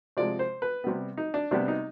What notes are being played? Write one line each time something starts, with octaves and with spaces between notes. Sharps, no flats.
C3 F3 G#3 D5
C5
B4
C3 G3 B3
D#4
D4
C3 G3 B3 D4
D#4